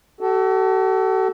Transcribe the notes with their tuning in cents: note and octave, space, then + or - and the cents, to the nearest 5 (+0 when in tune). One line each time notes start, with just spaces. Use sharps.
F#4 +45 A4 +0